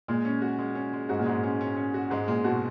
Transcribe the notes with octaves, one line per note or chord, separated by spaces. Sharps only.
A#2 G#3
C#4
F#4
G#3
C#4
G#3
G#2 F#4
A#2
G#2 G#3
C#4
C#4
C#4
F#4
G#2 G#3
A#2 G#3
B2 F#4